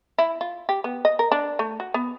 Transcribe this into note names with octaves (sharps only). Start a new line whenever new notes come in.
E4
F4
G4
B3
D#5
A#4
D4
A3
F#4
B3